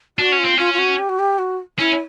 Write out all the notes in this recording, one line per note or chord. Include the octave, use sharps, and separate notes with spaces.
D4 F#4
C#4
F4
C4
C#4 F4
F4
F#4
G4
F#4
G4
F#4
C#4 E4